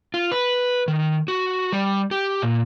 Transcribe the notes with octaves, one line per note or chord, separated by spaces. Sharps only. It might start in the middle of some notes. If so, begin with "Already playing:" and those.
F4
B4
D#3
F#4
G3
G4
A#2